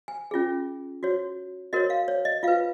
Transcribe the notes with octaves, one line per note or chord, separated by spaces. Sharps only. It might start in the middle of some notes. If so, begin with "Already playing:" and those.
G#5
C#4 F4 G#4
F#4 C#5
F#4 A#4 C#5 D#5
F5
C#5
D#5
F4 B4 F5